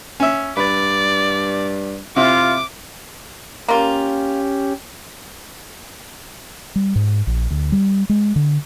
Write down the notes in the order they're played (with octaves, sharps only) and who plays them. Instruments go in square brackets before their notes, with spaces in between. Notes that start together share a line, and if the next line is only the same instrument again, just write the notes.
[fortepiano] C#4 E5
[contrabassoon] G2 [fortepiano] B4 [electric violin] D5
[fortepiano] C3 E4 [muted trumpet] F4 [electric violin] D6
[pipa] A#3 F4 [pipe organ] C#4 G4
[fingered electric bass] G3
G#2
A#1
D2
G3
G#3
D3